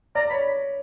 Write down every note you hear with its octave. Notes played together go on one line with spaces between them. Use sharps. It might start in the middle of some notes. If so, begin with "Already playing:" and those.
D5 A#5
C#5 B5